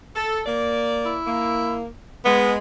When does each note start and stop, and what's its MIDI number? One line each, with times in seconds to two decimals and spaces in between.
0.16 0.41 69
0.46 1.17 58
0.46 1.17 74
1.05 1.80 64
1.27 1.86 58
2.25 2.58 56
2.25 2.55 59